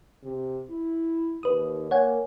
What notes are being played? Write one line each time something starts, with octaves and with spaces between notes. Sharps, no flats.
C3
E4
D#2 B4 D#6
A#3 C#5 F#5 G#5